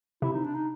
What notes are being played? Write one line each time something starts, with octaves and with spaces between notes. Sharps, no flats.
C3 E4
D#4
D4
D#4